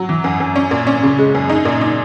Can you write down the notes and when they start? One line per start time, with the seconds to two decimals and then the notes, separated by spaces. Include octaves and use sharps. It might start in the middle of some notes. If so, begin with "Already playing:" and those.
Already playing: F#3
0.09 E3
0.24 F#2
0.40 F#2
0.56 C#4
0.71 A#2
0.87 C#4
1.03 C#3
1.19 G#3
1.35 F#2
1.50 D#4
1.65 A#2
1.81 D#4